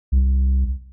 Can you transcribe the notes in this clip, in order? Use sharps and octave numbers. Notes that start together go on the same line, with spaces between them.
C2